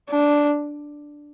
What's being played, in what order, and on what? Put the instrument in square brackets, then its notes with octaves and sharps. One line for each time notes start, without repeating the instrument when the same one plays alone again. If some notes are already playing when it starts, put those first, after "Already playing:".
[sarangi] D4